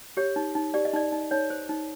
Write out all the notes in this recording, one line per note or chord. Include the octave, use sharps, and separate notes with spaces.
G4 C#5
D#4
D#4
G4 D5
D#5
D#4 D5
D#4
D#4 C#5
C5
D#4